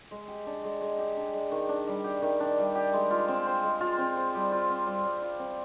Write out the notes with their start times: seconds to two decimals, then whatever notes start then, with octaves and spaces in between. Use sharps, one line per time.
0.11 G#3
0.28 G4
0.47 D4
0.64 G#3
0.81 G#3
0.99 G4
1.17 D4
1.34 G#3
1.52 D#3
1.69 D4
1.87 G3
2.04 G4
2.22 D#3
2.40 D4
2.58 G3
2.75 G4
2.93 G#3
3.11 F4
3.28 C4
3.46 C5
3.64 G#3
3.81 F4
3.98 C4
4.17 C5
4.35 G3
4.52 F4
4.70 C4
4.86 G3
5.05 G3
5.22 F4
5.39 C4